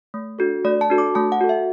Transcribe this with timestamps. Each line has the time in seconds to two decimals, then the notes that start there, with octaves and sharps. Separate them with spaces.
0.14 A3
0.39 D4 F#4 A4
0.64 A3 D5
0.81 A5
0.90 D4 F#4 A4
0.98 D6
1.15 A3 A5
1.32 F#5
1.41 F#4 A4
1.49 E5